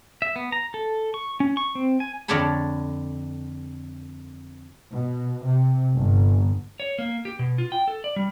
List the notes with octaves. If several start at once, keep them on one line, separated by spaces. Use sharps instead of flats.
E5
B3
A#5
A4
C#6
C#4
C#6
C4
G#5
F2 D3 D4 C#5 A5 B5
B2
C3
G1
C#5
A#3
G4
B2
F4
G5
A4
D5
G3